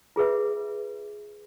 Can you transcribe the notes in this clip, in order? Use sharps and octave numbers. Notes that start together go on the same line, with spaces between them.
F4 G#4 B4 E5